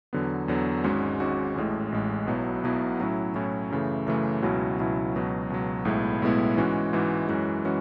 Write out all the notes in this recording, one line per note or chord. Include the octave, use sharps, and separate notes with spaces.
E2 D3 F#3 B3
E2 D3 F#3 B3
G#1 G#2 G#3 C#4 F#4
G#1 G#2 G#3 C#4 F#4
A1 A2 G#3
A1 A2 G#3
B1 B2 F#3 B3 E4
B1 B2 F#3 B3 E4
A2 F#3 C#4 E4
A2 F#3 C#4 E4
F#2 C#3 E3 A3
F#2 C#3 E3 A3
C#2 B2 F#3 C#4 E4
C#2 B2 F#3 C#4 E4
C#2 B2 F#3
C#2 B2 F#3
B1 A2 G#3 B3 E4
B1 A2 G#3 B3 E4
G#2 E3 G#3 C#4 F#4
G#2 E3 G#3 C#4 F#4
F#2 E3 G#3 C#4 F#4
E3 G#3 C#4 F#4